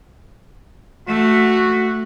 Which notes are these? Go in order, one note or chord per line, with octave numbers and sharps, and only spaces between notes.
A3 F#4